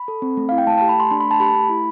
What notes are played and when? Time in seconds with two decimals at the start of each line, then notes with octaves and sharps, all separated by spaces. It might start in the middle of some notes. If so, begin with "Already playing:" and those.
Already playing: B5
0.08 A4
0.22 C4
0.37 A3
0.49 E4 F5
0.58 G5
0.67 A3 A5
0.78 G4 A5
0.89 B5
0.96 A3 C6
1.11 D4 C6
1.20 A3 B5
1.31 A5
1.40 G4 B5
1.55 A3
1.70 E4